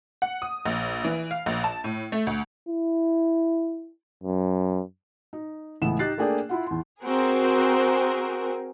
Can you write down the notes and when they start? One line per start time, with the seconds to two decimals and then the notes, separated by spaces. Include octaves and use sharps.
0.22 F#5
0.42 D#6
0.66 A#1
1.04 E3
1.31 F5
1.46 A#1
1.64 A5
1.84 A2
2.12 A3
2.27 D2
2.69 E4
4.24 F#2
5.33 D#4
5.82 C#2 A2 E3 B3 E7
5.99 D#4 G4 F#6 A6 C7
6.18 A3 A#3 D4 G#4 D5 G5
6.49 E4 F4 F#5
6.67 E2 C6
7.03 C4 F#4 G#4 A#4